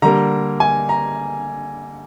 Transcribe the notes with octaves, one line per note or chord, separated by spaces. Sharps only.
D3 G3 A#3 A#5
G#5
A#5